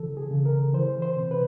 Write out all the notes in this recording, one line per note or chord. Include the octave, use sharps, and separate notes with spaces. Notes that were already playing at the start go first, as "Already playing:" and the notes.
Already playing: C#3 E3 A4
G#4
C#3
A#4
E3 C5
C5
C3
B4